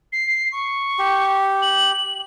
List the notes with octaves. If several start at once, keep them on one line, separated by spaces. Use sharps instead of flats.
C7
C#6
G4
F#7